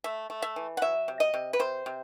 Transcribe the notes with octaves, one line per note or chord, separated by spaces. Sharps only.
A3 E5
A3
E5
E3
F#5
F#3 E5
C3
D#5
C3
B4
C3 C5
C3